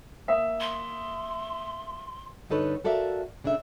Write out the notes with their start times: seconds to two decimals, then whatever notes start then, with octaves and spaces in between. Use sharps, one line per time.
0.28 A#3 E5 D#6
0.60 C6
2.49 G2 D3 D#4 A4 B4 C#5
2.84 F#4 A4 A#4 D5 E5 F5
3.44 C#3 D4 A4 E5